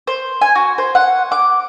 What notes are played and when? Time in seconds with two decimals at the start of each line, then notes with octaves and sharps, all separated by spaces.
0.07 C5
0.41 G#5
0.55 F#4
0.78 C5
0.95 F#5
1.32 D6